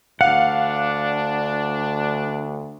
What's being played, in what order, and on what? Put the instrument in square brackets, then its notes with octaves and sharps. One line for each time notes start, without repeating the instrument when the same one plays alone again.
[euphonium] D2 [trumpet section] D4 [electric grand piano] F5 [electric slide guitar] F#5